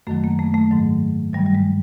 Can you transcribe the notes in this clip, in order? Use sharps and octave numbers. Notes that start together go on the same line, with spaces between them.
F#2 D#3 F#3 A3
A#3
A3
A3
G#2 D#3 F#3
G2 D#3 F#3 G3
G3
G#3